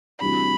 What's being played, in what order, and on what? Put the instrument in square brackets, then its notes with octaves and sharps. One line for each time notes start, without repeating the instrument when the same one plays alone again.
[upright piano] D2 C3 E3 G3 D4 [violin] B5